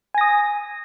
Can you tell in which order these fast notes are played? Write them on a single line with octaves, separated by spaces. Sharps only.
G#5 A#6 D#6